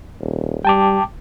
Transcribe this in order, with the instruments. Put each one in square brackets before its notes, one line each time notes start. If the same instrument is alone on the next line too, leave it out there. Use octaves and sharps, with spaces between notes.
[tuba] D#1
[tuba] G3 [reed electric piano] G5 A5 D6